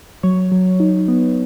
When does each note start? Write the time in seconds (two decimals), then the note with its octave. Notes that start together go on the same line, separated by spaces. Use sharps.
0.23 F#3 C#5
0.52 F#3
0.80 D#4
1.08 B3